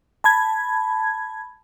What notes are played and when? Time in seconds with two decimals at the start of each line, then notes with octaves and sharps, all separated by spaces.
0.24 A5 B5 G#6